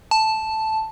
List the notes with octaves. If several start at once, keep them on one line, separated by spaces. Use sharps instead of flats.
A5